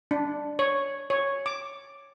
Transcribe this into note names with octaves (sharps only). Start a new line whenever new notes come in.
D4
C#5
C#5
D6